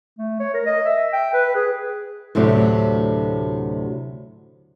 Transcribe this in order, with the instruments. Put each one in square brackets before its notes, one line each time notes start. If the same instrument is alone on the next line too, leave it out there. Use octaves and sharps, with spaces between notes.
[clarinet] A3
C#5
A#4
D#5
E5
G5
B4
G#4
[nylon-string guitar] D2 A2 C3 F#3 D4